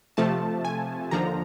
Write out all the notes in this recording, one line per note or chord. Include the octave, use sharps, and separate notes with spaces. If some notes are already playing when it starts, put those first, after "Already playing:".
C3 F3 A3 A5
G#5
D#2 D3 F3 A#5